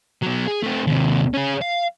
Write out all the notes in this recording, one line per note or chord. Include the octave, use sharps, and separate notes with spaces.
F#3 B3
G#4
A3 C4
D#2 C3
C#4 G#4
F5